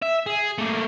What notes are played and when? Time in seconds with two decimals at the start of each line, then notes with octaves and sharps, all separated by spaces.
0.02 E5
0.26 G#4
0.58 A3 A#3